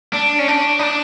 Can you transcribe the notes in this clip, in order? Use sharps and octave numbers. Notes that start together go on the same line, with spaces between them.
D4
C#4
D4
D#4
D4